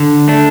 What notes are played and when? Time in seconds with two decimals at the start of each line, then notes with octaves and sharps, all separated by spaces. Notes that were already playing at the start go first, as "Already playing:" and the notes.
Already playing: D3
0.28 A3 D4